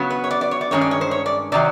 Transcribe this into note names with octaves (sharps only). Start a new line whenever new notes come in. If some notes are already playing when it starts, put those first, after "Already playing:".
Already playing: C#3 F#3 B3
B4
C#5
D5
D5
C#5
D5
G2 D#3 G#3 C#4 C#5
D5
C#5
C5
C#5
D5
C3 D#3 F#3 D5